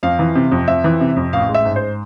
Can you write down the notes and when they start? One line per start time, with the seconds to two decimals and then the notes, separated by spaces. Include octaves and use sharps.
0.03 F2 F5
0.19 E3
0.35 C3
0.51 F2
0.68 F2 E5
0.84 E3
1.00 C3
1.16 F2
1.33 A1 F5
1.49 G#3
1.54 E5
1.65 G#2
1.76 C5